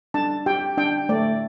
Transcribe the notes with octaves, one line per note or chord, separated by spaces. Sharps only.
D4 A5
G4 G5
D4 G5
A3 D5